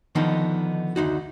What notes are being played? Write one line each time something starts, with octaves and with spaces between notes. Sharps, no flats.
D3 D#3 F3 B3 D#4
D2 D#4 F#4